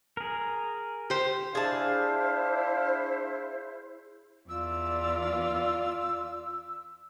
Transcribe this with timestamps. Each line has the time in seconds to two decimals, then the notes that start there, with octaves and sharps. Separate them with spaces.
0.17 G#4 A#4
1.10 G4 C5
1.55 D4 E4 G#4 C5 F5 A5
4.49 E2 F4 D5 E6